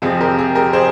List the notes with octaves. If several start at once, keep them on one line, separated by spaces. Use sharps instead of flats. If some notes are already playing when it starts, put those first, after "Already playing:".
F2 C3 F3 C4 G#4
G4 A#4
G#4
G4 A#4
G#4 C5